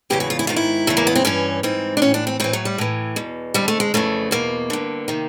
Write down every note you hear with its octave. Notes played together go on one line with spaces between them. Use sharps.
E2 C#3 E3 G4
F#4
F4
E4
G#2 D#3 F4
E4
E2 C#3 E3 A3
A#3
B3
C4
G2 E3 C#4
G#2 E3 C4
D4
A2 E3 C#4
D4
C4
A2 E3 C4
F#3
G3
A2 E3
E2 B2
F2 D3 G3
A3
G#3
F2 C#3 E3 A3
E2 B2 A#3
G2 D3
C3 D#3